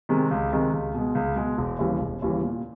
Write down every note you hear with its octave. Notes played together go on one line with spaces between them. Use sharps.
C3 D#3 G#3
C#2
C3 D#3 G#3
C#2
B2 G#3
C#2
B2 G#3
E1
D#2 C#3 E3 G3
E1
D#2 C#3 E3 G3
A#2